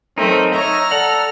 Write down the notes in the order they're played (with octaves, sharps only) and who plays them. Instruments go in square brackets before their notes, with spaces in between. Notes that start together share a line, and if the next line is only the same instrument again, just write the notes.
[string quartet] F#3 A3 [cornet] C4 [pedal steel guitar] D#4 A#4
[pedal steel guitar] D#4 E5 [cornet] C#5 [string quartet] A#5 F6
[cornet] A4 [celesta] D5 [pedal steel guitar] F#5